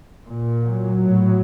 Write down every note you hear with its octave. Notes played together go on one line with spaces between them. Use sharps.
A#2
F#3
A2